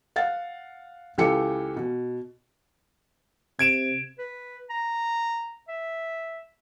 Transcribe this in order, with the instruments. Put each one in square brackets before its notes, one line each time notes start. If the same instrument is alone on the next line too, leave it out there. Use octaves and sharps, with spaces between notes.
[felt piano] F5 F#5 A6
C#2 E3 G4 A4 C#7
B2
[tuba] C3 [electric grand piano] G#6 D7 E7
[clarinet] B4
A#5
E5